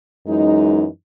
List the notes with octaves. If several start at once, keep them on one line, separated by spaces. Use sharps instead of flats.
F#2 E3 G#3 D#4